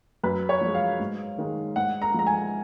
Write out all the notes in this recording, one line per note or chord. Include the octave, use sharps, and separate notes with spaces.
F#2 B4
C#5
F3
G#3
F5
G#2
D#3 G#3
G#2 F#5
A#5
F3 G#3 A#5
G#5